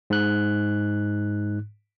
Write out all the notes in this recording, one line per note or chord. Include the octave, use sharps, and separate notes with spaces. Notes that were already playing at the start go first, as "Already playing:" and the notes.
G#2 F#6